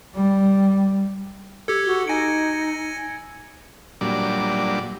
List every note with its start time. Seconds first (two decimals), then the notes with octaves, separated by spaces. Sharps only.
0.16 G3
1.68 G4 A4 E6 G#6 C#7
1.86 F#4 G7
2.07 D#4 G#5 A#6 C#7 D7
4.01 A#2 F#3 G3 D4 D6